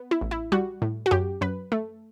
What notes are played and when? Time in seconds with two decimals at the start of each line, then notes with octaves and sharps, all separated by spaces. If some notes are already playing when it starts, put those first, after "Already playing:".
Already playing: B3
0.11 E4
0.21 A1
0.31 E4
0.52 G3 F#4
0.82 A2
1.06 F#4
1.11 F#2 G4
1.41 F#2 B4
1.72 A3